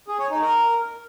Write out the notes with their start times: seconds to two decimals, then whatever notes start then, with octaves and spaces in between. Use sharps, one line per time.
0.08 G#4
0.19 C#5
0.31 D#4
0.42 A#4